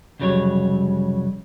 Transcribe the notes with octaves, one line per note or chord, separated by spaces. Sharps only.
C2 F2 C#3 F#3 G3 C#5